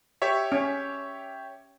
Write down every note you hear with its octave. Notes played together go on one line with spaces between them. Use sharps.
G4 C#5 E5
C#4